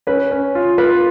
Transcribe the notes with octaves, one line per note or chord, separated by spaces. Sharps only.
C#4 B4
C#4
F4
F4 B4